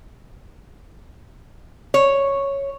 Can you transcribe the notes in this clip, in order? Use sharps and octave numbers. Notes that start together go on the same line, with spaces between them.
C#5